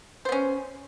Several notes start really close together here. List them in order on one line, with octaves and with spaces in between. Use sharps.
C5 B3 C#4